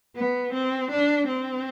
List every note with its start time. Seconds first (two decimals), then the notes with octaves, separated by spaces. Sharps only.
0.16 B3
0.53 C4
0.91 D4
1.27 C4